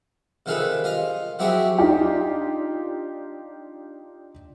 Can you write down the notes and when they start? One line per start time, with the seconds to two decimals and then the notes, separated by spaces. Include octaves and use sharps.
0.46 C3 D#3 F4 G#4 A4 B4
0.84 F4 D#5 F5
1.39 F#3 C4 E4 G4 G#4 C#5
1.78 D4 D#4 F4 G4